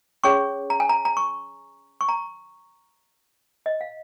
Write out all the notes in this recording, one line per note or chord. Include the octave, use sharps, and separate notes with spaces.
C#4 G#4 C#5 C#6
A#5
G#5
A#5
A#5
C#6
C#6
A#5
D#5
F5